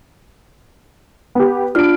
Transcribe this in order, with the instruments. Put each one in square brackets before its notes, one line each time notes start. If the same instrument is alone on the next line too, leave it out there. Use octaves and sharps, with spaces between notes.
[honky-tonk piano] B3 G4
[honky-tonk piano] D4 D7 [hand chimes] F4 F6